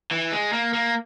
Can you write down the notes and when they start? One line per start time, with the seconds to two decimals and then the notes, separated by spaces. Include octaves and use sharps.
0.11 E3
0.32 G#3
0.53 A#3
0.73 A#3